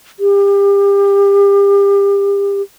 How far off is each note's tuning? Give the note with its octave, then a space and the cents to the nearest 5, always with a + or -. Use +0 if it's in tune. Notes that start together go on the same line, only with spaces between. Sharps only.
G4 +30